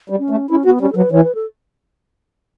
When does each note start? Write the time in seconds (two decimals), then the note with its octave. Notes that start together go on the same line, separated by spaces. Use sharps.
0.10 G3
0.19 C#4
0.30 A3
0.50 C#4 E4
0.65 B3 F#4
0.81 G3 C#4
0.92 A4
0.96 F#3 B4
1.12 E3 C#5
1.24 B4
1.35 A4